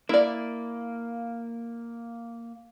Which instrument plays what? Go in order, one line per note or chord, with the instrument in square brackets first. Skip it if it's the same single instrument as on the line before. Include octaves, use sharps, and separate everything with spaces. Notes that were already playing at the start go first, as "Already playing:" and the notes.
[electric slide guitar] A#3 [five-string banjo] E4 D5